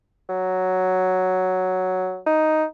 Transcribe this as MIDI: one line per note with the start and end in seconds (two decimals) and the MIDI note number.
0.29 2.19 54
2.26 2.64 63